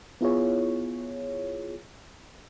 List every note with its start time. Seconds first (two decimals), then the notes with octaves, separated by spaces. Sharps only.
0.21 B3 E4 F4 G#4 C#5